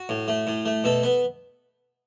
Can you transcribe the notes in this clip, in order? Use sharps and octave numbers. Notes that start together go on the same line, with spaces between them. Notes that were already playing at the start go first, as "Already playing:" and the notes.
Already playing: F#4
A2
A3
A2
A3
B2 A4
B3